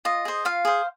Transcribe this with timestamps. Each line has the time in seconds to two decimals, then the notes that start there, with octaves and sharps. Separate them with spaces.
0.05 F4 D#5
0.25 G#4 C5
0.45 F4 F5
0.65 G#4 C5